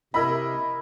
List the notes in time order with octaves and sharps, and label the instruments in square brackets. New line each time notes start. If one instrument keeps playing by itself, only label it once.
[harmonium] C3 [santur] E4 B5 [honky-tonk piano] A#4 D#5